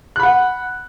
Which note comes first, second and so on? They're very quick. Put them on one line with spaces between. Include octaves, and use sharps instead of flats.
F#6 B5 F#5